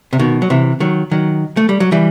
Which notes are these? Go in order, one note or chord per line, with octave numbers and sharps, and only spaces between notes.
C3
B2 D#3
F#3
C3 E3
D#3 F#3
D#3 F#3
A3
G3
F#3
E3 G3